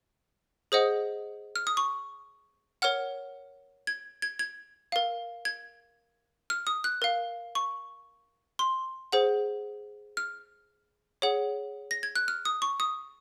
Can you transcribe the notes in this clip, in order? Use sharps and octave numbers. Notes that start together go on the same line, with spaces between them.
G#4 C5 D#5 F#5 D#6
F6
D#6
C#6
A#4 C#5 F#5 F6
G#6
G#6
G#6
A#4 F5
G#6
F6
D#6
F#6
A#4 F5
C#6
C6
G#4 C5 F#5
F6
G#4 C#5 F#5
A#6
G#6
F#6
F6
D#6
C#6
D#6